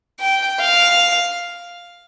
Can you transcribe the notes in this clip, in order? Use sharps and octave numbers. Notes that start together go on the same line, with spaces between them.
G5
F5